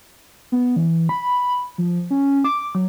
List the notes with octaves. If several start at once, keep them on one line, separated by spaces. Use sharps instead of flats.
B3
E3
B5
F3
C#4
D6
F#3